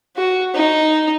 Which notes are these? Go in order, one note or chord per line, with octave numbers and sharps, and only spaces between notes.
F#4
D#4